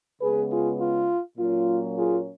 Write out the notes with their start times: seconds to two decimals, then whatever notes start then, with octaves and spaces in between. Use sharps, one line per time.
0.21 C#3 G#3 B3 G#4 B4
0.51 F4 G#4
0.80 F4
1.38 A#2 F#3 A#3 C#4 F4
1.96 F4 G#4